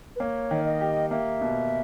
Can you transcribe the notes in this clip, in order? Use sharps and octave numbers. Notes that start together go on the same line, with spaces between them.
B4
A#3 C#5
D#3
D#5
G4
A#3 E5
B2